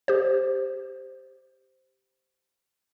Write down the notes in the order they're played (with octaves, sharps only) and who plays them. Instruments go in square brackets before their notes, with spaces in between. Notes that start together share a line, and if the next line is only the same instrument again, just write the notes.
[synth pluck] G4 C5